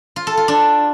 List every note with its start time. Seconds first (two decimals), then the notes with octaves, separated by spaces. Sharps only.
0.16 F4
0.27 A4
0.37 F4
0.48 D4